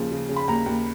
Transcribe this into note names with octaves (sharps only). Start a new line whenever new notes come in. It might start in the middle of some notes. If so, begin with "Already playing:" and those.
Already playing: D#2 C#3 F3
C#3
C#3
B5
D#2 A#5
D#2